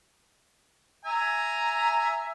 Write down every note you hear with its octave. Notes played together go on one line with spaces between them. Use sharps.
E5 G#5 A#5